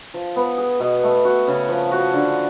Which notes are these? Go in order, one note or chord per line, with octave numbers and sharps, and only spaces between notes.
F3
B3
G#4
B2
A3
F#4
C#3
F3
F#4
D3